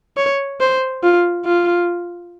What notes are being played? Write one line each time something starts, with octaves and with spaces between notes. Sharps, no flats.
C#5
C5
F4
F4